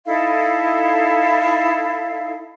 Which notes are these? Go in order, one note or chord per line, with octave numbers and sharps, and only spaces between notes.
D#4 E4 A4 F5